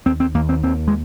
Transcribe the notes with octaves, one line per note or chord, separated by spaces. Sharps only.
D#2 C4
C4
D#2 A#3
C4
D#2 C4
G#3